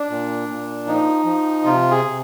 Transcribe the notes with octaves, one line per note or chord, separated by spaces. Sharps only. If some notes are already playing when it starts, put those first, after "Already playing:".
Already playing: D4
A#2
A#2
F3 D#4
F3
C3 F4
G#4
C3